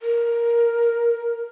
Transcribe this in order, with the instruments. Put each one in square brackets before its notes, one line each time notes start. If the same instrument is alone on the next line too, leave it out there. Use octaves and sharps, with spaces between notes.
[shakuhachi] A#4